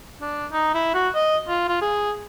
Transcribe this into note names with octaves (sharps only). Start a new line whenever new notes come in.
D4
D#4
E4
F#4
D#5
F4
F4
G#4